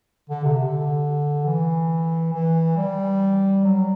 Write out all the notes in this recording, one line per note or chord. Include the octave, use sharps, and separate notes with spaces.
D3
C3
D3
E3
E3
G3
F#3